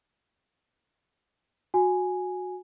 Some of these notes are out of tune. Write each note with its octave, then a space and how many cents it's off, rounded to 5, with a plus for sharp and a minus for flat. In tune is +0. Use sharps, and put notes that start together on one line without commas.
F#4 -20 G#5 +0